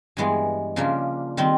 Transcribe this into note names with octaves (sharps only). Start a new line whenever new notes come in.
G2 E3 G#3 B3
C#3 F3 A#3 D4
D#3 G3 C4